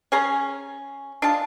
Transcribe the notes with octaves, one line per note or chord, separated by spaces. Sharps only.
C#4 G#4 A#5
D4 D#4 F4 A5